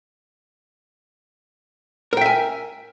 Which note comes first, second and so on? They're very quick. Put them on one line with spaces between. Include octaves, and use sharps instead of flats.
A#4 G5 E5 G#5